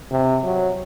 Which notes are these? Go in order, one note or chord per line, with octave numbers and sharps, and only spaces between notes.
C3
F#3